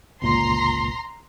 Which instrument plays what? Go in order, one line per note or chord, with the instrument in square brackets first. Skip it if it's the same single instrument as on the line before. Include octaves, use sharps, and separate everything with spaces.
[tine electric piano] G1 C#2 A#2 [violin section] A#5 C6